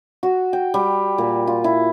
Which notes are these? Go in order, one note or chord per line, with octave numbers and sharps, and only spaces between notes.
F#4
G5
G3
A#2
F4
E4